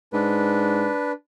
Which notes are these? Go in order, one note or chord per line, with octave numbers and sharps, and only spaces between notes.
G#2 D4 B4